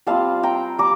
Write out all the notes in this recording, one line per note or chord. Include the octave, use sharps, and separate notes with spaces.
G3 C4 F4 F5 A5
G5 A#5
G3 A#5 D6